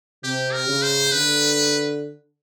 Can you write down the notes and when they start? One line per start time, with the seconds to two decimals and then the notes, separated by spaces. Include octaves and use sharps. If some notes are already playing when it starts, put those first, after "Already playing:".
0.24 C3 G4
0.53 A#4
0.68 C#3
0.83 C5
1.12 D3 B4